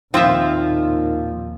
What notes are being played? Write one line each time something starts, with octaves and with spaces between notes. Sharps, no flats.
D#2 A#2 D#3 F3 C4 F4 E5